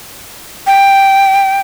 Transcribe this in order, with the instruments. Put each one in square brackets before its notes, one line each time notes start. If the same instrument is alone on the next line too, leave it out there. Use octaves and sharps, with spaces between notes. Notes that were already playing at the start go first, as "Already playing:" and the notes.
[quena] G5